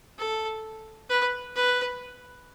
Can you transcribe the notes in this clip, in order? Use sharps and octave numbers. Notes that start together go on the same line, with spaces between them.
A4
B4
B4